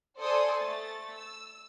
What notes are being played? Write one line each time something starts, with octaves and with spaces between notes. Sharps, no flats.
A4 C5 D5 G#5 C6 D#6
A3 A6
E6